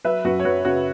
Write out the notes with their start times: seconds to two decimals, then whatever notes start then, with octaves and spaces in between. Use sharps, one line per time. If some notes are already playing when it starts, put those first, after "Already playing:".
0.05 F#3 B4 E5
0.25 F#2 F#4 B4
0.39 C#5
0.45 F#3 F#4 B4
0.65 C#3 F#4